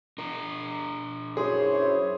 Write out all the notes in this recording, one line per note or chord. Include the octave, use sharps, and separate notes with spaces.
D4 A#4
F#2 E4 G#4 C5 C#5